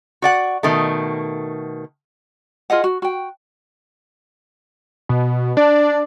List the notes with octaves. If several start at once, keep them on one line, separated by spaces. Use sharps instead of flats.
F#4 D5 F#5
B2 D#3 A3
F4 G#4 D#5 F#5
F#4
F#4 G5
B2
D4 D5